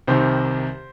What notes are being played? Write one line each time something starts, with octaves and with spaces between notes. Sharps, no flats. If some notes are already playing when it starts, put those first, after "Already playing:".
C2 C3 D#3 C5